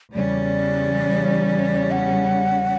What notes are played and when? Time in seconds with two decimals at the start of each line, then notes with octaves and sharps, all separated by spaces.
0.14 E2 C#3 G3 C#4 D5
1.91 F#5